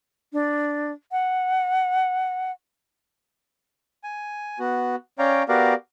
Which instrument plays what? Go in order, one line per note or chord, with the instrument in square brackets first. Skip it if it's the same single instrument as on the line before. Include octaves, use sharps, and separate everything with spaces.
[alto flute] D4
F#5
[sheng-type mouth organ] G#5
B3 F#4
C#4 C#5 D5 F5 G5 A#5
B3 F#4 G4 A#4 D5 F5